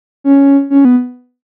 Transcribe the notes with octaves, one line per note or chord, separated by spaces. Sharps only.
C#4
C#4
B3